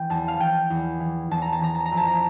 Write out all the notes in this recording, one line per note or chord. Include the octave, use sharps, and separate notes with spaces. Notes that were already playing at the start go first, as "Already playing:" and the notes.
Already playing: E3 G5
E2 A5
F5
E3 G5
E2
E3
E2 A5
A#5
A5
E3 A#5
A5
A#5
F2
A5
A#5